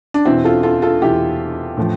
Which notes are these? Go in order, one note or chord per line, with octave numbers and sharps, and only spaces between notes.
D4
E2 B2 C4 E4
F4 A4
F4 A4
F4 A4
E2 B2 E4 G4
A2 F3